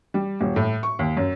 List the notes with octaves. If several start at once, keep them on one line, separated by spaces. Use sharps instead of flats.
G3
D#1
A2
C#6
D#2
F#2